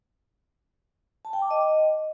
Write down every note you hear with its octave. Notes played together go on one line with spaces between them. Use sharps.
A5
G5
D6
D#5